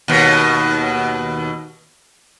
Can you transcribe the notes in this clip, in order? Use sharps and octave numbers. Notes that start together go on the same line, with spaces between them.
D#2 B2